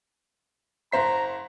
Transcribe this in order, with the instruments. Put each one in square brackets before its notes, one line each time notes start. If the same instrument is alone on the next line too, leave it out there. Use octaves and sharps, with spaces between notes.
[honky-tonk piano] F#1 C5 B6 [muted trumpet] A#5